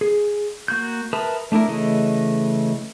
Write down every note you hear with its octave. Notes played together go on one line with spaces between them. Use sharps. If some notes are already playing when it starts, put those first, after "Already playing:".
G#4
A#3 F#4 G6
A#4 B4 E5 A5 D#6
A3 D4 E4 A#4
C#3 E3 A3 D#5